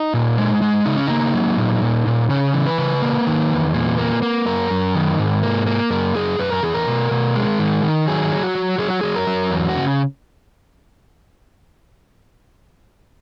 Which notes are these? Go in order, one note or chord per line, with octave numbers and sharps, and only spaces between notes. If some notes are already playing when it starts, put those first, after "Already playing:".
Already playing: D#4
A#2
G#3
G#3
C#3 D#4
C#4
A#3 D#4
F#3
A#2
A#2
A#2
C#3 C#4
E3
B4
C#3
A#3
D#3
E2
A#2
A#3
A#3
F#2 A#4
F#2
D#3
G#2
A#3
A#3
F#2 A#4
F#2 G#4
F#2 B4
A#4
E2 G#4
A#4
B2
B2
G#3
D#3
D#3
F#3 G#4
F#3
F#4
F#3
F#3 G#4
F#4
F#3 G#4
A#4
F#3
E2
F#4
C#3